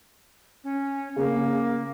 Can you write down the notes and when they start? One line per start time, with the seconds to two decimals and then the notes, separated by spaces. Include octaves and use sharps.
0.64 C#4
1.16 C#3 A#3